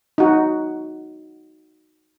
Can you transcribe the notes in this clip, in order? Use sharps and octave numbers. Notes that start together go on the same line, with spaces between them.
D#4 F#4